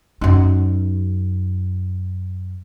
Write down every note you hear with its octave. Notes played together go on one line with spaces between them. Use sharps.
F#2 D#4